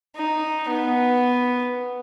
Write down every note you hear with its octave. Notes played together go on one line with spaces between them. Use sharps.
D#4
B3